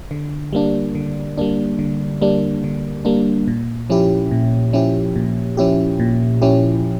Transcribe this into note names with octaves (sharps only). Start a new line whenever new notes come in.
D3
G3 A#3 D4
D3
G3 A#3 D4
D3
G3 A#3 D4
D3
G3 A#3 D4
A#2
F3 C#4 E4 G4
A#2
F3 C#4 E4 G4
A#2
F3 C#4 E4 G4
A#2
F3 C#4 E4 G4